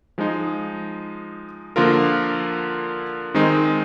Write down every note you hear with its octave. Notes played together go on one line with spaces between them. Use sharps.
F3 G#3 D#4
D3 F3 A#3 F4 A#4
D#3 G#3 C4 D#4